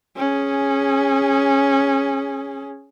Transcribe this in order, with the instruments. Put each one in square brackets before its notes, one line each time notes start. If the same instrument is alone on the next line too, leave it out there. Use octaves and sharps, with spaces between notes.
[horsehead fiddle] C#4 G#4